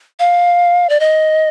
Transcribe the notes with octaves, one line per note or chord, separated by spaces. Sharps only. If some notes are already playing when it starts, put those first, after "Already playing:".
F5
D5
D#5